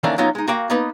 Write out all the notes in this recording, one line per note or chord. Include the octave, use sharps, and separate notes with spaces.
D#3 E3 A3 A#3 C#4 D4
F#3 B3 C#4 D#4 F4
G#3 D#4
A#3 F#4 F5 G5
A#3 B3 D#4 B4